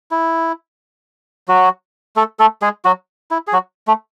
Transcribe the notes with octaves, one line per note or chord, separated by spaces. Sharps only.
E4
F#3 F#4
A3 A4
A3 A4
G#3 G#4
F#3 F#4
E4
G#4
F#3 F#4
A3